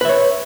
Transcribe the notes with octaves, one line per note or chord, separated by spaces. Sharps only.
B4 C#5 E5